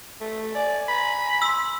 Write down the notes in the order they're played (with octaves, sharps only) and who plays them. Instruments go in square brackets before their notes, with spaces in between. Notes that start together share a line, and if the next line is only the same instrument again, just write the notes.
[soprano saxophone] A3
[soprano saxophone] D5 [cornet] G#5
[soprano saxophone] B5
[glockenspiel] C6 E6